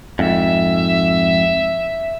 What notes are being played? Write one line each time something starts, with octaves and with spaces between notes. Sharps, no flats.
F2 G#2 E5